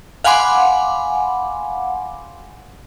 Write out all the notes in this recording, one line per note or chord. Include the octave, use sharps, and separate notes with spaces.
F5 F#5 G#5 B5 C6 D6